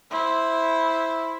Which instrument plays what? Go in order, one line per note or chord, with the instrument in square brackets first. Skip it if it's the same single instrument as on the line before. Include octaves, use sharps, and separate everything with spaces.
[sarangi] E4 [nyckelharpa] C5